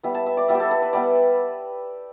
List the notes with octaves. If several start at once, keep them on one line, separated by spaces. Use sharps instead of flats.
G3 B3 E4
A5
E5
D5
G3 B3 E4 E5
G4
A4
A4
B4
G3 B3 E4 D5